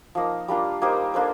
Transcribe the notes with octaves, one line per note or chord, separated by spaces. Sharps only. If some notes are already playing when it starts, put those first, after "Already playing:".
F3 A#3 D#4
G3 A#3 D4 F4
A#3 D#4 G4 C5
A#3 D4 A4 C5